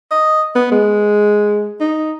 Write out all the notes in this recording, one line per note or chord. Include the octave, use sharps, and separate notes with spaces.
D#5
B3
G#3
D#4